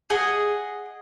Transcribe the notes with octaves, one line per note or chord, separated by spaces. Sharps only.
G#4 D#5 F#5